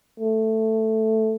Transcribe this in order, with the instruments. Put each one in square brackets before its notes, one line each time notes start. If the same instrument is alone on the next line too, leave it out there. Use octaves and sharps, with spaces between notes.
[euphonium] A3